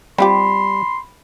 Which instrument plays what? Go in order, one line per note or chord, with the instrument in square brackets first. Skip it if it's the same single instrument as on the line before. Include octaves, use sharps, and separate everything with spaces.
[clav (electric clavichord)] G3 [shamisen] C4 F4 G4 [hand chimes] B5 [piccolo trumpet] C6